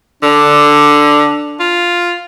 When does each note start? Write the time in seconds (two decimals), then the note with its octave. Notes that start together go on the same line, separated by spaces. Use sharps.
0.23 D3 D4
1.60 F4